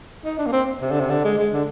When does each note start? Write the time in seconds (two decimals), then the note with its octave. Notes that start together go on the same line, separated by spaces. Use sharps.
0.25 D#4
0.38 D4
0.46 A#3
0.52 C4
0.81 C3
0.91 D3
1.00 C3
1.10 D3
1.24 G#3
1.38 G#3
1.53 D3